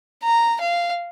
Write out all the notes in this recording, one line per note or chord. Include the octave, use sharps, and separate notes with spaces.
A#5
F5